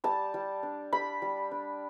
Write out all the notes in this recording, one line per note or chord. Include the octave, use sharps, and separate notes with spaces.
G3 A5
G3
D4
G3 B5
G3
D4